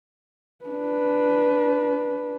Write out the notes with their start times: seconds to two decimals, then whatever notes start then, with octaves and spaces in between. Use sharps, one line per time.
0.65 D4 B4